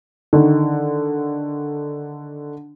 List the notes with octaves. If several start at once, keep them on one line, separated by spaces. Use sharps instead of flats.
D3 D#3